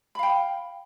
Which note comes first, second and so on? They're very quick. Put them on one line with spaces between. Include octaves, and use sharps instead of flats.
B5 F5 G5